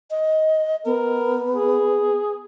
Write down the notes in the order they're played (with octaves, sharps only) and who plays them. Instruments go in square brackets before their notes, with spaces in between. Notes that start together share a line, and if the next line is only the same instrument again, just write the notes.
[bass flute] D#5
[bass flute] B3 [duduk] A#4
[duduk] G#4